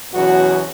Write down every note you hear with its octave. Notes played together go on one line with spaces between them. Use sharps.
E2 B2 F#3 C#4 F#4